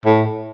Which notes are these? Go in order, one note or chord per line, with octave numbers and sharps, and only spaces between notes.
A2